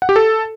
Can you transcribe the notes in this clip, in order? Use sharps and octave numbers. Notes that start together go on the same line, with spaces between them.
F#5
G4
A4